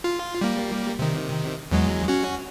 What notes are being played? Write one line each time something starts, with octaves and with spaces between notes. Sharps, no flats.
F4
G3 A#3
C3 D#3
E2 F#3 G#3
C#4 F#4